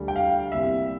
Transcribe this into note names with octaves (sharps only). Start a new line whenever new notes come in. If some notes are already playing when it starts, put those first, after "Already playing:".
Already playing: D2 D3 G3
G5
F5
C2 A#2 G3 E5